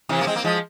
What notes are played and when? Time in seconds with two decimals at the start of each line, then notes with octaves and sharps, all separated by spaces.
0.09 C3 E3
0.21 A#3
0.27 G#3 C4
0.36 A#3
0.44 F3 G#3